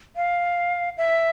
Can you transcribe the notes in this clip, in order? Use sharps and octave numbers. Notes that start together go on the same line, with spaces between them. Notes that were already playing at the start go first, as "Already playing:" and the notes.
F5
E5